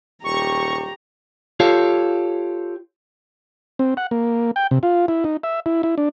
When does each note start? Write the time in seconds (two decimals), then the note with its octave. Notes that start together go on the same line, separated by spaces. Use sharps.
0.24 D#1 G4 A#5 C#6
1.60 F4 G4 A4 C#5 F5
3.79 C4
3.97 F#5
4.11 A#3
4.56 G5
4.71 C3
4.83 F4
5.08 E4
5.24 D#4
5.44 E5
5.66 E4
5.83 E4
5.98 D4